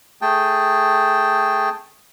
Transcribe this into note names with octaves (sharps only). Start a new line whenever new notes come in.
A3 G#4 G5 A5